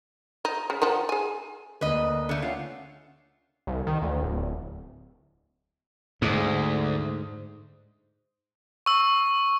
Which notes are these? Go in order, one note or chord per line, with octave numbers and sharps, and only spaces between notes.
D#4
C#3
D#3 F3 F#5
G#4 G#5
D2 A#3 B4 D#5
D3 A3 C#7
C#4 F4 F#5
C2
D#3
D2
D1
D2 G#2
C#6 E6